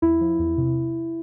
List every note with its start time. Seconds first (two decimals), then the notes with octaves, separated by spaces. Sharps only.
0.02 E2 E4
0.21 F3
0.39 E2
0.57 C3